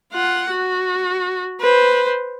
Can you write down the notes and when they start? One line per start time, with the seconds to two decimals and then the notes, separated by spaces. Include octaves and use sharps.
0.13 F4 F#5
0.50 F#4
1.60 B4 C5